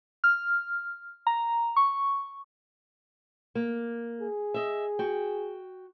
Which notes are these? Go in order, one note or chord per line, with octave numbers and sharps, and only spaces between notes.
F6
A#5
C#6
A#3
G#4
D#5 E5
F#4 G5